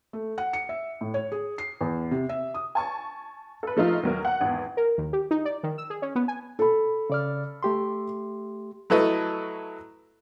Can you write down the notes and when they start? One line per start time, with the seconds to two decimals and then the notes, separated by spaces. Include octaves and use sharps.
0.13 A3
0.38 F#5
0.53 C#7
0.69 E5
1.01 A2
1.14 C#5
1.32 G#4
1.58 C7
1.81 E2
2.11 C3
2.29 E5
2.54 D#6
2.75 G#5 A5 C#6
3.63 A4 B4
3.77 F3 A3 D#4 F4
4.03 D#2 F#3 A#4
4.25 F#5
4.41 G#1 E2
4.77 A#4
4.98 D#2
5.13 G4
5.31 D#4
5.45 D5
5.63 D#3
5.78 E6
5.90 G#4
6.02 C#4
6.15 B3
6.28 G#5
6.59 A4 B5
7.10 C#3 D5 F6
7.63 A3 G4 C6
8.90 F#3 A3 E4 A4 B4 D#5